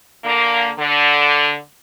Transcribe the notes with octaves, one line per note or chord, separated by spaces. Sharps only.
D3 A#3
D3